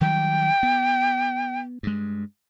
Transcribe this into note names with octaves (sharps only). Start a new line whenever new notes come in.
D#3 F#3 G3 G5
B3
G2 G#3